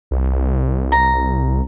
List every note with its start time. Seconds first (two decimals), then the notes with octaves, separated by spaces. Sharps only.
0.11 C2
0.92 A#5